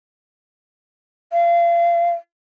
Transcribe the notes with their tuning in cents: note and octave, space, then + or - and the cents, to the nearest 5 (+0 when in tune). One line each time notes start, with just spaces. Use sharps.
F5 -30